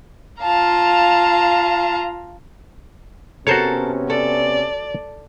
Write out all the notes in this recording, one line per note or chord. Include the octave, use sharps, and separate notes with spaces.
F4 F5 A5 A#5
C3 B3 C#4 F#4 A4 A#4 C5 C#5
A4 D5